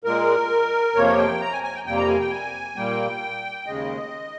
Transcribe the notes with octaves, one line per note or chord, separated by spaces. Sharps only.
A#2 G#3 A#4
F2 C3 F3 A#3 C#5
G5
A#5
G#5
G#5
G5
F2 C3 G3 A#3 G5
A#5
G#5
G5
G#5
A#2 G3 A#3 G5
D#2 C#3 G#3 D#5